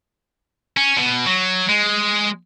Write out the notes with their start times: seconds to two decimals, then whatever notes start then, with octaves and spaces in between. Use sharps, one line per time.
0.77 C#4
0.97 B2
1.26 F#3
1.70 G#3